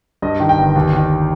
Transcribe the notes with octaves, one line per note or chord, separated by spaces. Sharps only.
G2 D#5
D#3
G5
G1
D#2
D#3